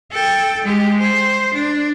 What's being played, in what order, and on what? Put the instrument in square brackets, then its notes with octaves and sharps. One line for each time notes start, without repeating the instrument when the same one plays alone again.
[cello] A4 G5
G#3 G4
C5
D4